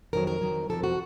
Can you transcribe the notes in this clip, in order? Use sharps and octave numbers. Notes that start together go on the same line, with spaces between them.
F2 D#3 F#3 A#4
A#4
F2 D#3 F#3
F2 C3 F3 A4
F#4